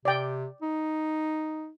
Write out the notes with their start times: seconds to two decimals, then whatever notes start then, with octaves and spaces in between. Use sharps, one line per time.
0.05 C3 D5 G5
0.62 D#4